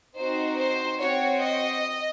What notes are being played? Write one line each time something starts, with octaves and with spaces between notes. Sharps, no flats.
C4 D#4 F#4 C5
C5
C4 F#4 C#5
D#5